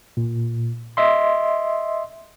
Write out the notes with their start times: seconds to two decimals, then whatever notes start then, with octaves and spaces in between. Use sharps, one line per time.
0.17 A#2
0.97 D#5 E5 C6